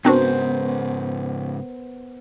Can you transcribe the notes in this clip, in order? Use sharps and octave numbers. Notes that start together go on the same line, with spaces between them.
G#2 C#3 B3 C4 D4 F#4 A#4 C5